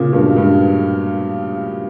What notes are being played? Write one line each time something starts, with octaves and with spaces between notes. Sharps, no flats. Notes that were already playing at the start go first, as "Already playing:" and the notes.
Already playing: A#2 C#3
G2 B2
G2